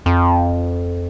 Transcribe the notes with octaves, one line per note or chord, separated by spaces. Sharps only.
F2